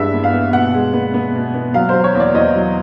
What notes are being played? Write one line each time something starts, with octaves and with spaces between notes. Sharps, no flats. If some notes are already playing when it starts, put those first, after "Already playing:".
Already playing: G2 E3 G#3 E5
B3
F5
B3
B2 F#5
G#3
B3
B3
B2
B3
F#3 F5
F#3 C5
C#5
E2
D5
E2 D#5
F#3